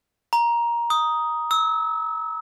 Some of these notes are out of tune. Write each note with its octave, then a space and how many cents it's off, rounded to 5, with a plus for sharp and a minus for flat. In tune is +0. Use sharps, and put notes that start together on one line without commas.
A#5 +15
D#6 +5
E6 -30